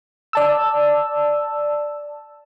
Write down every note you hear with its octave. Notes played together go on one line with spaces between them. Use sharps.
D5 A5 E6